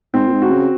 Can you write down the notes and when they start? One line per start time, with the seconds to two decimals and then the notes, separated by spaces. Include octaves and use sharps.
0.14 G#2 C4
0.27 A#2
0.33 G#2
0.42 F#4
0.51 C#3